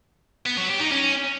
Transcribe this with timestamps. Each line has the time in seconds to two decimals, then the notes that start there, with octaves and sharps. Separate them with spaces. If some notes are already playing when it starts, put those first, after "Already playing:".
0.46 B3
0.57 F#3
0.69 G4
0.80 D#4
0.92 C#4